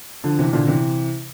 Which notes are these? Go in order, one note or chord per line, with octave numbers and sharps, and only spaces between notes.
D3 F3
C3 E3
A#2 D3
C3 E3